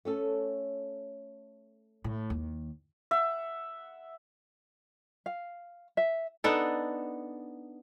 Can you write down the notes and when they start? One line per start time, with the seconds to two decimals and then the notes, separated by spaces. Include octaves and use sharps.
0.05 A3 C#4 A4
2.04 A2
2.30 D#2
3.11 E5 F#5
5.26 F5
5.97 E5
6.44 B3 D4 D#4 A4